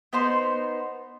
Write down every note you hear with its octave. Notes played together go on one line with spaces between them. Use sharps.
B3 D#4 C5 C6